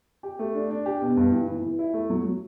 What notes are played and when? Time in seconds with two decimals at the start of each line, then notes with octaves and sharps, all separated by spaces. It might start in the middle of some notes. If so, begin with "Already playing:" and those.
0.23 G4
0.39 A3
0.55 D4
0.70 D4
0.86 G4
1.01 B2
1.17 G2
1.32 E3
1.48 E3
1.62 E3
1.79 E4
1.93 A3
2.10 F#3
2.25 F#3